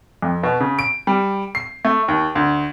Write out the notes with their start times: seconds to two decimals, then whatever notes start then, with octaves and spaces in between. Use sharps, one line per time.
0.22 F2
0.43 B2
0.60 C#3
0.79 D7
1.07 G3
1.55 C7
1.85 A3
2.08 D#2
2.35 D2